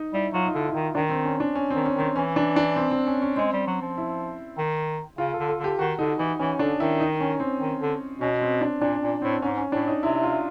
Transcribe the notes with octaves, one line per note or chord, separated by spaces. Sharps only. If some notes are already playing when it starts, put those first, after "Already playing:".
Already playing: D#4
G3 E4
F#3 F4
D#4
D3 E4
E4
D#3 D#4
D#3 D4
C4
C#4
D4
C#4
C4
D#3
C#4
D#3
C4
E3 C#4
D4
D4
C4
C4
C#4
C#4
G#3 C4
G3
F#3
F3
E4
D#3
C#3 F4
A4
D3
A4
D3
G4
D#3 F#4
D3 D#4
E3 D#4
E3 C#4
D3 D4
D#3 E4
D#4
C#4
C4
D#3
D3
B2 C#4
C4
D4
A#2 D4
A#2
A2 C4
G#2 C#4
C#4
A2 D4
D#4
C3 E4
F4